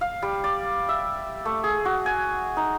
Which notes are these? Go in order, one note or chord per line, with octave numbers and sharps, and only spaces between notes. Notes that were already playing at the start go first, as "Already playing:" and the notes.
F5
G3
D5
E5
A3
G#4
F#4
G#5
D#4